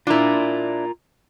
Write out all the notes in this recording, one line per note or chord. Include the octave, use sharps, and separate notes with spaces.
D4 E4 F4 A#4